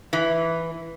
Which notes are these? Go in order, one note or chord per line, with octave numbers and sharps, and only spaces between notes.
E3